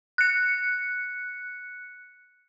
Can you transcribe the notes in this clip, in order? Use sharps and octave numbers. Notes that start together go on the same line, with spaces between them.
F#6 C#7